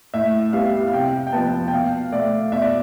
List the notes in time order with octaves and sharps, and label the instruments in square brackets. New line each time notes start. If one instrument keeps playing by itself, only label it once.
[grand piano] A2 E5
G3 B3 F5
F5
C3 G5
G5
F3 B3 A5
G5
B2 F5
A3 D5
B2 E5
D5